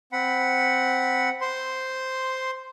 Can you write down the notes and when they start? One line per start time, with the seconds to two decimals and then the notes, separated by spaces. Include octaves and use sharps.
0.12 C4 F#5 B5
1.41 C5 C6